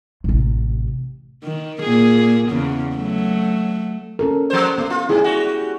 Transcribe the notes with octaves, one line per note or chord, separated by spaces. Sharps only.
A1 C3
D#3
A#2 G#4
E2 C#3
F#3 A3
C#4 A4 A#4
F3 C5
A3 B3
F4
G#2 E4 G#4
G3 F#4